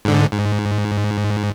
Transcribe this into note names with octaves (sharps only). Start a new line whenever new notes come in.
G#2 D3
G#2